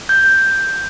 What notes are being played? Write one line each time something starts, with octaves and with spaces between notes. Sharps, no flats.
G6